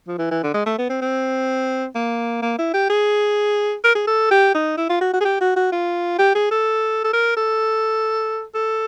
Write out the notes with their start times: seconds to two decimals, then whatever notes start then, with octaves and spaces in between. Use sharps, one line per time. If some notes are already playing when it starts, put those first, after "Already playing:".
0.08 F3
0.19 E3
0.31 E3
0.43 D3
0.54 G#3
0.66 A3
0.78 B3
0.90 C4
1.01 C4
1.95 A#3
2.42 A#3
2.58 E4
2.74 G4
2.90 G#4
3.84 A#4
3.95 G#4
4.07 A4
4.31 G4
4.55 D#4
4.78 E4
4.90 F4
5.01 F#4
5.14 F#4
5.21 G#4
5.25 G4
5.41 F#4
5.56 F#4
5.72 F4
6.19 G4
6.35 G#4
6.51 A4
7.04 A4
7.13 A#4
7.37 A4
8.55 A4